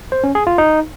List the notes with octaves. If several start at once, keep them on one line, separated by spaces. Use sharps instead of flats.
C5
C#4
G#4
F4
D#4